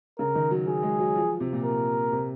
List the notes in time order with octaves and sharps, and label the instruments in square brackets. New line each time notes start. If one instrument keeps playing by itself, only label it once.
[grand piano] C#3 [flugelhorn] A#4
[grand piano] D#3
F#3
[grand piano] F#3 [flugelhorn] G#4
[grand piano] G#3
F#3
F3
C3
A#2
[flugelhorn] A#4
[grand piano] C3